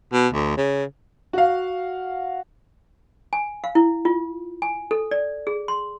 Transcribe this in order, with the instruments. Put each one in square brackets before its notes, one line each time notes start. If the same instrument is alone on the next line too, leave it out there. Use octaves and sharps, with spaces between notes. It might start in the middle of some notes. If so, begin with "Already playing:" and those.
[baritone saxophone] B2
D2
C#3
[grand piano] F#4 F5
[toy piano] G#5
F5
E4
F4
G#5
A4
D5
G#4
C6